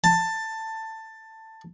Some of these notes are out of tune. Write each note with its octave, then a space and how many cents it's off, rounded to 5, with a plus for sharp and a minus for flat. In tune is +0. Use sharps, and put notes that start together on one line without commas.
A5 +15